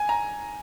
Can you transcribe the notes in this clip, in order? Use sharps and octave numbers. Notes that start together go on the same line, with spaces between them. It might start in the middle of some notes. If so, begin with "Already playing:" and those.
Already playing: G#5
A#5